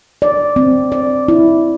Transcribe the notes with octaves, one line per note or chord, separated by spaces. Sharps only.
D5
C4
D5
E4